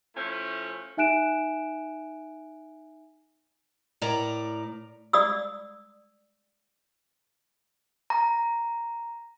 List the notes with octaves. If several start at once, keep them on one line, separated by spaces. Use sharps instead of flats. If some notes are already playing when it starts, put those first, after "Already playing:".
F3 A3 C#4 E4
D#4 E5 G#5 F#6 D7 E7
A2 A#4 D5 A#5
D5 D#6 E6
A#5